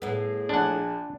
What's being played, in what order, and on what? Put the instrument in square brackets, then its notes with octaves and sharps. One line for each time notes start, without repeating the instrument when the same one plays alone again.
[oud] A2 B3 [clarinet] G#4
[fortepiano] A#1 G#5 [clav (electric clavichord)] D4 F#5